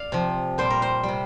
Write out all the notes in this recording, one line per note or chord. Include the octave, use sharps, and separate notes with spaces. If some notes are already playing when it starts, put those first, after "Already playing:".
Already playing: D5 F5
C3 F3
A#2 G3 C5
A#4
C5
G3
C3